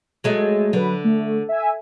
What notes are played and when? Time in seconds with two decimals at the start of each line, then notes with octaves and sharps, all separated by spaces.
0.24 F#3 G#3 A3
0.73 D3 F#3 B4
1.04 A3
1.49 E5 G#5